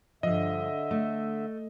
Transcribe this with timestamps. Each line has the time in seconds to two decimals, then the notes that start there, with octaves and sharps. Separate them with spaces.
0.23 G2 D3 F3 D#5 E5
0.91 A3